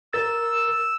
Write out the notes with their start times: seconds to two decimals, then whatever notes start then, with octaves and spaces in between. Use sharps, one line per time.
0.13 A#4 E6 A6